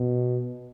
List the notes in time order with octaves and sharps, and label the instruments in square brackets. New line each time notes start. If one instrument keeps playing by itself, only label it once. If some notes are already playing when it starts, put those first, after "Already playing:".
Already playing: [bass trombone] B2